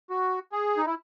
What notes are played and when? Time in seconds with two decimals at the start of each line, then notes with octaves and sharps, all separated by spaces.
0.10 F#4
0.52 G#4
0.77 D#4
0.86 E4